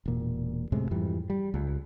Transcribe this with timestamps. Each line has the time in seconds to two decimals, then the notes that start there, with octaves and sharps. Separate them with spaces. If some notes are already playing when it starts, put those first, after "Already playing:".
0.06 E1 A#2
0.72 F#2 A2 C3 G#3
0.91 F2 G#2 E3 G3
1.30 G3
1.54 C#2